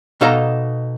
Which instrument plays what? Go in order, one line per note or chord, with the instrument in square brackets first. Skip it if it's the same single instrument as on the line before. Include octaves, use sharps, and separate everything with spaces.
[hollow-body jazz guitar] B2 D#4 A4 F5 A#5